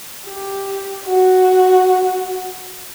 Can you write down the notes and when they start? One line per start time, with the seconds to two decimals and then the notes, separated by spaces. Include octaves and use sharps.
0.27 G4
1.05 F#4